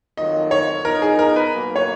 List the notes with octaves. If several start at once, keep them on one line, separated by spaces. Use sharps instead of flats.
F2 D#3 F#3 A#3 F4 D#5
C#5
F3 B3 D#4 A#4
G#4
A#4
B4
B2 F#3 A#3
C#5